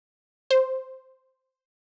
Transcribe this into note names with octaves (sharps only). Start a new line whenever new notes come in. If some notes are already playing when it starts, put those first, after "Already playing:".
C5